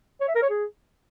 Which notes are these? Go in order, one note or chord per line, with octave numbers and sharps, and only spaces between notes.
C#5
E5
A#4
C#5
G#4